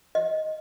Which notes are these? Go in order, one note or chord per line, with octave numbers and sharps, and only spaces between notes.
D#5